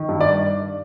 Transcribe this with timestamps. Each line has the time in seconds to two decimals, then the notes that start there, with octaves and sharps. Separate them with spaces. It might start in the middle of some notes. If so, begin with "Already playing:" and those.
Already playing: D#3
0.09 G2
0.21 D5